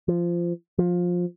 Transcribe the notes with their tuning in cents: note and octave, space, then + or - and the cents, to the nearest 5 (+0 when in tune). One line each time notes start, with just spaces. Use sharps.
F3 -15
F3 +20